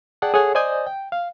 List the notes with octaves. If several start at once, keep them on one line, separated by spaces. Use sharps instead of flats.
G#4 D5 F#5 G5 A5
G#4 A4 C#5 F#5 G#5
C5 D5 D#5 G#5 D#6 G6
G5
F5